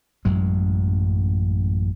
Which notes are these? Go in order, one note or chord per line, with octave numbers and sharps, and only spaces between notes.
A1 F#2 F#3 G#3